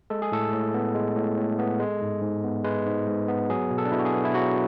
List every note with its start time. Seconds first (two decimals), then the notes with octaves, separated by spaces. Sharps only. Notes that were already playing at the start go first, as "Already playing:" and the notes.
0.10 G#3 A4
0.22 G#4
0.32 A2 A4
0.52 A2
0.74 B3
0.95 G#3
1.16 A2
1.37 A2
1.59 B3
1.80 G#3
2.01 G#2
2.22 G#2
2.44 B3
2.64 G#3 B4
2.86 G#2
3.07 G#2
3.28 B3
3.49 F#3 G#4
3.71 B2
3.78 A4
3.85 D4
3.91 B2 E4
3.99 F#4
4.05 G#4
4.13 B3
4.25 E4
4.34 F#3 F#4